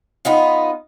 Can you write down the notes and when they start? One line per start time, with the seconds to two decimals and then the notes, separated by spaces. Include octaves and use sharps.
0.25 B3 D#4 F4